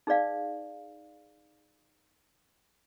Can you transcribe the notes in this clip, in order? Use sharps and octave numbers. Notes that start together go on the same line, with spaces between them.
D#4 G#4 B4 D5 F5